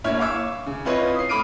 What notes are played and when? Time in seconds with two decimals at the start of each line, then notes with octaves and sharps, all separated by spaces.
0.04 A#1 E4 C#5 E5 F6 G#6
0.19 F5 C#6 D6 E6
0.66 C#3
0.85 C4 E4 F4 B4 C#5 D#5
1.15 D#6 C7
1.29 A3 B5 D6 F6 D7 D#7